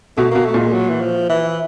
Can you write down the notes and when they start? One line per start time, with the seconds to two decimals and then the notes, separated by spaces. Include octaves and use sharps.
0.17 B2 A3
0.31 B2 A#3
0.45 A3
0.54 A#2 G#3
0.73 F#3
0.89 E3
1.01 F3
1.29 E3